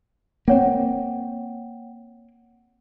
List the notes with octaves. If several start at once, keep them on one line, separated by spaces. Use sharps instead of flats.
A#3 C4 C#5 F#5 G5